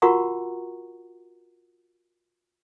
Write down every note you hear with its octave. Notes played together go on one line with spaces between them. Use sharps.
F4 F#4 A#4 F#5 A#5 C#6